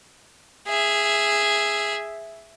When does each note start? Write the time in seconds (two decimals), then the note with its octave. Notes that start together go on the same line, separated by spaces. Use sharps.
0.67 G#4 E5